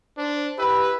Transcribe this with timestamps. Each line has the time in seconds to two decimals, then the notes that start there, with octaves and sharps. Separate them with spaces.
0.18 D4 C5
0.58 E4 G4 B4 E5